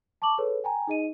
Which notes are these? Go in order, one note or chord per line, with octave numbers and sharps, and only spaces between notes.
A5 C#6 D6 F#7
G#4 A4 B4 C#5
G5 G#5 A#5
D#4 G#4 D#5 D#7